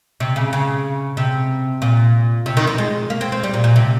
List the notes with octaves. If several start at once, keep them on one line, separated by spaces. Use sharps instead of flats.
C3
C#3
C#3
C3
A#2
C3
D#3
F3
G#3
A#3
C4
C4
G3
A#2
A#2
C3